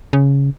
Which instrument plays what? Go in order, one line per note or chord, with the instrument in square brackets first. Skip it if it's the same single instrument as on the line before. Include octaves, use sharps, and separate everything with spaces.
[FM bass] C#3